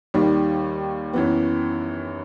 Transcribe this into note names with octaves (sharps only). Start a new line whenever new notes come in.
D#2 D#3 G3
F#2 E3 B3